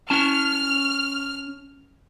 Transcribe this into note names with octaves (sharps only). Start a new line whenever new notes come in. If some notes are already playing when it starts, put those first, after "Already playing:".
C#4 A5 F6